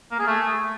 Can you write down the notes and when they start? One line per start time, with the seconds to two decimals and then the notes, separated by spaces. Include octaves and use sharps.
0.11 A#3
0.19 G#4
0.27 A3